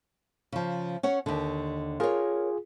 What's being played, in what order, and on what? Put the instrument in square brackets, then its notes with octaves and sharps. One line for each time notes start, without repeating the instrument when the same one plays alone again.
[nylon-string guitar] C#3 F3
C#4 C#5 F#5
D#2 D3
[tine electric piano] F4 G#4 [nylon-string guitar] A#4 C#5